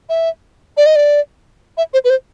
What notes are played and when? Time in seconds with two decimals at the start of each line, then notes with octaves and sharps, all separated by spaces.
0.09 E5
0.77 D5
0.86 D#5
0.96 D5
1.77 E5
1.94 C5
2.04 B4
2.10 C5